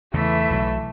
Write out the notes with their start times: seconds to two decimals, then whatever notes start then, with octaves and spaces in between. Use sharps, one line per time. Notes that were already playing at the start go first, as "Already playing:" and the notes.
0.14 E2 C#3 E3 A3 E5
0.50 B1 F#3